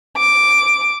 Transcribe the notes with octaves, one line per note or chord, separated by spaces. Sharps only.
D6